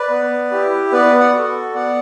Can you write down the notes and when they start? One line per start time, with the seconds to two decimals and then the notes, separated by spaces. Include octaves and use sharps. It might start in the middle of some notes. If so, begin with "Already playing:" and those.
Already playing: B4 D5
0.10 B3
0.51 E4 G4
0.92 B3 B4 D5
1.20 D5 F#5
1.33 F#4 A4
1.74 B3 D5 F#5